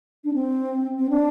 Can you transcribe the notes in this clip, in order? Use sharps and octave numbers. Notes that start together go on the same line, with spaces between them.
D4
C4
C4
D4